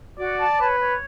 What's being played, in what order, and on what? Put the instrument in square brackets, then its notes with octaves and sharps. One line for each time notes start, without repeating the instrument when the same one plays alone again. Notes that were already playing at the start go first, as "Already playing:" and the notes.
[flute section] F#4 [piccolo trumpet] D5
[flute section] A5
[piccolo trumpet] B4 [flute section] C#5
[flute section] C#5